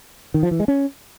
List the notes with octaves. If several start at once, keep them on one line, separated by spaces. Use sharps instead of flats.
D#3
F3
E3
G#3
C#4